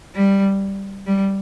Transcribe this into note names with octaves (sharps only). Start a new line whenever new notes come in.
G3
G3